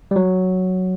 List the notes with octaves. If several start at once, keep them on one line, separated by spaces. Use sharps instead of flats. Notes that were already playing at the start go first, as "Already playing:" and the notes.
G3
F#3